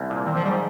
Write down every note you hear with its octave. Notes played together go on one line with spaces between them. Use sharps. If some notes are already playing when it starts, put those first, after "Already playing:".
Already playing: C2
A#2
D#3 C4
F3
G#2 G3